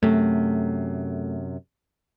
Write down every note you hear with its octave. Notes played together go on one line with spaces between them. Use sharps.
F#2 C3 A3